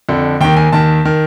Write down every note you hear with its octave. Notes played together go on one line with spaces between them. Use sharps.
F2 D3
D#2 D#3 G5
G#5
D#2 D#3 A5
D#3